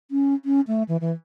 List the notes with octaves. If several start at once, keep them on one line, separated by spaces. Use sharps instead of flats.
C#4
C#4
A3
E3
E3